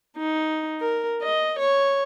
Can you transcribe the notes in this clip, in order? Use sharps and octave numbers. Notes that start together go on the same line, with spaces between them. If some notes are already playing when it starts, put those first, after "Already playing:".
D#4
A#4
D#5
C#5